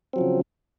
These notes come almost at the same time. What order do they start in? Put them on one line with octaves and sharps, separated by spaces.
C4 F#3 F3 C#3